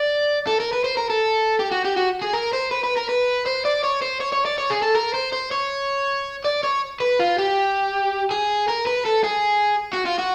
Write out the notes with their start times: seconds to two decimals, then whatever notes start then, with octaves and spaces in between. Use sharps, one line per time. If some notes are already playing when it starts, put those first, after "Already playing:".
Already playing: D5
0.47 A4
0.60 A#4
0.73 B4
0.84 C5
0.97 A#4
1.10 A4
1.60 G4
1.72 F#4
1.85 G4
1.97 F#4
2.22 G#4
2.33 A#4
2.53 C5
2.71 B4
2.83 B4
2.96 A#4
3.09 B4
3.46 C5
3.65 D5
3.84 C#5
4.02 C5
4.21 C#5
4.33 C#5
4.46 D5
4.58 C#5
4.70 G#4
4.82 A4
4.95 A#4
5.14 C5
5.33 C5
5.51 C#5
6.45 D5
6.63 C#5
7.00 B4
7.19 F4
7.38 G4
8.31 G#4
8.69 A#4
8.87 B4
9.06 A4
9.24 G#4
9.93 F#4
10.05 F4
10.18 F#4